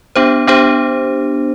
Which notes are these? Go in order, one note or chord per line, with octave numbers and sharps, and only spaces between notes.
B3 D4 G4 C5
B3 D4 G4 C5